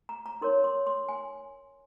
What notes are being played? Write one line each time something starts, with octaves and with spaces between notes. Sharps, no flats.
A#5
A#5
D#4 A#4 C#5 C6
C6
C6
G#5